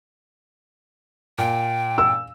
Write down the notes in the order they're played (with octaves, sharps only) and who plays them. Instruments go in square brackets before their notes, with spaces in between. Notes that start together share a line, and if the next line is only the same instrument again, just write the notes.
[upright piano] A#2 [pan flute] G5
[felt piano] E6